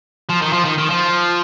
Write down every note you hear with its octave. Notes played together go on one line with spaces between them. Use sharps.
F3
D#3
F3
D#3
D#3
F3